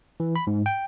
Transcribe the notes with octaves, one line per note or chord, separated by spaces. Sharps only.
E3
B5
G#2
G5